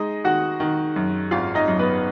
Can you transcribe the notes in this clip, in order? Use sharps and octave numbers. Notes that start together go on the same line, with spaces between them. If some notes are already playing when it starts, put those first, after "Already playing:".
Already playing: G#3 D#4 D#5
D#3 F#4 F#5
D#3
F#2
G#1 F4 F5
D#4 D#5
F#2
B3 B4